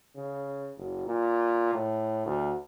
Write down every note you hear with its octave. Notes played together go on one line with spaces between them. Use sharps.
C#3
F#1
A#2
A2
D2